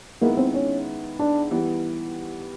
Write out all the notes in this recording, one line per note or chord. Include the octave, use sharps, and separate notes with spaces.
D#3 G#3 A#3 B3 E4
C4
C#4
D4
E3 G3 B3